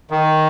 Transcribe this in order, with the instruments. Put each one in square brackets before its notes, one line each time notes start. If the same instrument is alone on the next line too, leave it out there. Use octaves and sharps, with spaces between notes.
[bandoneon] D#3